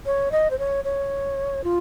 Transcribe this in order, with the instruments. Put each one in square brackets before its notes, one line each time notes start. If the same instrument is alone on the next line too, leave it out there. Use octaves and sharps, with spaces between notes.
[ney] C#5
D#5
C5
C#5
C#5
F4